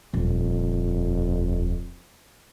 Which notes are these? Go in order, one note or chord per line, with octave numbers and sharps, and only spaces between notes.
D#1 F2